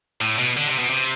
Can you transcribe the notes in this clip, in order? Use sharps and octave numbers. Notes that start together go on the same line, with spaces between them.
A2
B2
D3
C3
B2
C3